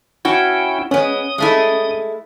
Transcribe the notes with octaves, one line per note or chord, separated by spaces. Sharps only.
C#4 E4 F#4 G5
G#3 B3 C#4 D#6
G#3 A3 E4